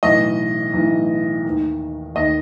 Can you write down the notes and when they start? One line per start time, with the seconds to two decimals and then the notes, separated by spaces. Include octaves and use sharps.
0.03 B1 A2 E3 D#5
0.74 B1 A2 E3
1.44 D#2 D#3
2.15 D#2 D#3 D#5